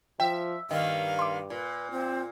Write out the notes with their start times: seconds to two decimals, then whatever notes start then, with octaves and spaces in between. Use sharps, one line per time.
0.20 F3 E5 G5
0.71 G2 D#3 A#3 D#5 F5
1.19 C6 D6
1.50 A#2 B4
1.91 C4 F4